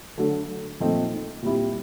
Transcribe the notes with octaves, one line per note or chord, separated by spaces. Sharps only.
D3 F#3 A3
A#2 F3 A3 C4 D#4
A#2 G3 C4 E4 G4